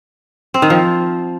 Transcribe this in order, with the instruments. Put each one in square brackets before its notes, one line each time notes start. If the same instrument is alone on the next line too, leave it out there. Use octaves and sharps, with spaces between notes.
[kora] C4
D#3
F3